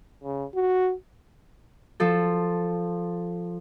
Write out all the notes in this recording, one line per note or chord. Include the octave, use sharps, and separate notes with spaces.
C#3
F#4
F3 A4